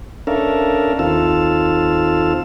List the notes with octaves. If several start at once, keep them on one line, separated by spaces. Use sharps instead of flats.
C#4 D4 A4 A#4 E5 F5
D#2 C4 F4 A4 F5 E6